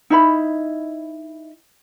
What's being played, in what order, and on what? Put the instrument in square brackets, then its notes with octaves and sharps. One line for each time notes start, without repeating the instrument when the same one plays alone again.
[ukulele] D#4 E4 B5